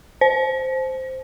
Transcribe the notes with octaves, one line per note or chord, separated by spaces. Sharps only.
C5